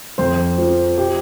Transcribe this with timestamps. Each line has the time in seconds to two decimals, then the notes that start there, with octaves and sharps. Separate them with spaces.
0.18 F2 C5
0.58 F3
0.98 G4